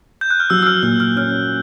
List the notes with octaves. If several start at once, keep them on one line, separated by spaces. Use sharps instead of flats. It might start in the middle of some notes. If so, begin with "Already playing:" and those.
G6
F#6
F6
F#3 E6
E6
F6
A#2 E6
F6
C#4 F6